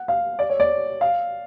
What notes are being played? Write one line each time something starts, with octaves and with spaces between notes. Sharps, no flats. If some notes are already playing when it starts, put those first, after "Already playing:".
Already playing: F#5
F5
D5
C#5
D5
F5